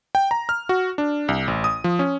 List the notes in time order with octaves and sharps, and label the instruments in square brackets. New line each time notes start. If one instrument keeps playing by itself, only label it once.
[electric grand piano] G5
A#5
F6
F#4
D4
C2
A1
D#6
F3
C#4